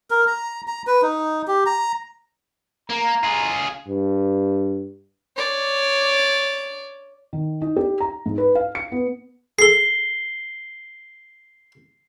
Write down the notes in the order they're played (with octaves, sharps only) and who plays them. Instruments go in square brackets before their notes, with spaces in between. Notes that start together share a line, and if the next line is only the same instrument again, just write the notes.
[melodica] A#4
A#5
A#5
B4
D#4
G4
A#5
[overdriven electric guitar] A#3 [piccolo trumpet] A#5
[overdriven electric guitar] F4 G#4
[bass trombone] G2
[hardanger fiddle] C#5 D5
[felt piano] D#3
D#4
G4
A#5
G#2
B4
F5
C#7
B3
[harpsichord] G#4 A4 [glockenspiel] C7 G7